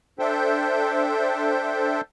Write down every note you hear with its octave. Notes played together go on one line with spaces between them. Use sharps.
D4 A4 C5 E5 G5